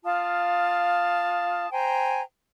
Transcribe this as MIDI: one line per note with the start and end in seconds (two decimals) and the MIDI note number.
0.04 1.71 65
0.04 1.71 77
0.04 1.71 81
0.04 1.71 87
1.71 2.21 72
1.71 2.21 79
1.71 2.21 80
1.71 2.21 82